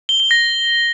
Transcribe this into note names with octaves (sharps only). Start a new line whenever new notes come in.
G7
G7
A#6